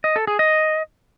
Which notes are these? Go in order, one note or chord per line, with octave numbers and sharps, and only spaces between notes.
D#5
A4
G#4
D#5